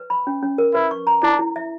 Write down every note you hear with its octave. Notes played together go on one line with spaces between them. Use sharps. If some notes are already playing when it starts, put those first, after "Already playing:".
Already playing: B4
B5
C#4
C#4
A#4
E4 B4
C#6
A#5
D4 E4
E4
E5